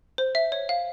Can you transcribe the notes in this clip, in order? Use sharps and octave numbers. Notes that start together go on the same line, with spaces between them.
C5
E5
C#5
F5